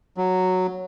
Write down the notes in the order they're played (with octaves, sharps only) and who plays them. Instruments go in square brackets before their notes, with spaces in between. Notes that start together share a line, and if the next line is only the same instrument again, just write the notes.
[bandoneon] F#3